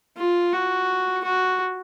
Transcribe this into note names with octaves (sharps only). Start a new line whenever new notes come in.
F4
F#4
F#4